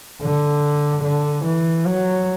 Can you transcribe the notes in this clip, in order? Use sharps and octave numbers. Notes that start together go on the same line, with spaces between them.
D3
D3
E3
F#3